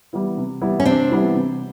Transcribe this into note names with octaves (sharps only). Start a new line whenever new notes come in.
E3 G3 B3 E4
C3
E3 G3 B3 E4
C#4
C3 C4 D4
E3 G3 B3 E4
C3